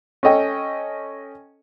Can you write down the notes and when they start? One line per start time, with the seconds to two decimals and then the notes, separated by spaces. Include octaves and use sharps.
0.23 C#4 A4 D#5 G5